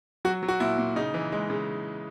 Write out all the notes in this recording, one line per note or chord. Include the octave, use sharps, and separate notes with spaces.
F#3 F#4
F#3
F#4
A#2 E4
A#2
C#3 D#4
E3
G#3
C#3